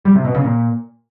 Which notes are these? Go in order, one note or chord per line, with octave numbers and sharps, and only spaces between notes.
G3
C3
B2
C#3
A#2